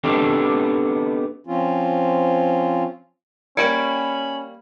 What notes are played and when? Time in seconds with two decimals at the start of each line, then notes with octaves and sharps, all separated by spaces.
0.04 B3 C4 D4 D#4 G4 A4
1.47 F3 C4 C#4 F4
3.57 G3 A#3 C#4 G5 B5 G#6 C#7 D7